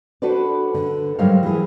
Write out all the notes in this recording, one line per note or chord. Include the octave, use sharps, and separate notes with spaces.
D4 F#4 A4 B4 C5 D5
D3
G#2 F#3 G3 A#4 C5 F5
E3 G#4